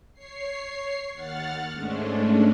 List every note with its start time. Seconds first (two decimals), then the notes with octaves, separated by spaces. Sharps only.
0.14 C#5 C7
1.14 D#2 F#5 F6 A6
1.73 G#2 G#3 A3 C#4 D4